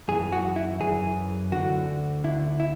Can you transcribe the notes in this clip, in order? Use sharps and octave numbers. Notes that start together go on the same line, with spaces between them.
F#2 E3 G#4
F#4
E4
F#2 E3 G#4
D2 D3 F#4
D2 D3 E4
E4